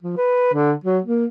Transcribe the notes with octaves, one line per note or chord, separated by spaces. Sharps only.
F3
B4
D3
F#3
A#3